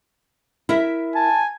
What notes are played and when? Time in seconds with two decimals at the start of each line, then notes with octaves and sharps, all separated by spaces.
0.69 E4 A#4 E5
1.15 G#5 A5